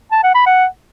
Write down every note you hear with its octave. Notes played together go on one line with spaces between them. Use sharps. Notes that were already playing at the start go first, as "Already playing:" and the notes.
A5
F#5
B5
F#5